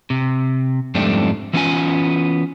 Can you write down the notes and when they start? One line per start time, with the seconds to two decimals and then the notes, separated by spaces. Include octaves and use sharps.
0.10 C3
0.95 F2 G#2 G3 A3 C4 D4
1.53 E3 B3 C#4 F4 G#5